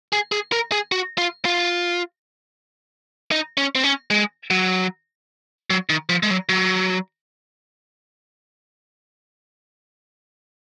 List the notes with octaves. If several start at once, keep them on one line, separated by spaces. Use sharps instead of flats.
G#4
G#4
A#4
G#4
F#4
F4
F4
D#4
C#4
C4
C#4
G#3
F#3
F#3
D#3
F3
G#3
F#3
F#3